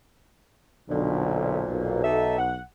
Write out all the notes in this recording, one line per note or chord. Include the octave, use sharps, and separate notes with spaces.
B1 F2 A#2 D3
B1
D#4 A4 E5
F#5